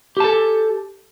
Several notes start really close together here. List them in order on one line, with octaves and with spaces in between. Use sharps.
G4 A5 A4